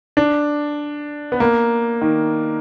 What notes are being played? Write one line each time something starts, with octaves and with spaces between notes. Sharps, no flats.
D4
B3
A#3
D#3